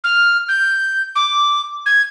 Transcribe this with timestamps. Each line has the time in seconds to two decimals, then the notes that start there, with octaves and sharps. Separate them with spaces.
0.04 F6
0.48 G6
1.15 D6
1.86 G#6